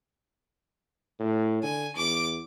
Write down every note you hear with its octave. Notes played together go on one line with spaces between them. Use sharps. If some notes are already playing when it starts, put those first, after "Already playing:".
A2
D3 G#5
E2 D6